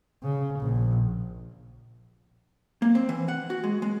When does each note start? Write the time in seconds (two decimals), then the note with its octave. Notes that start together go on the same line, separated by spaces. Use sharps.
0.23 C#3
0.60 A#1
2.82 A#3
2.95 C4
3.09 E3
3.28 F#5
3.50 F#4
3.64 G#3
3.82 G#3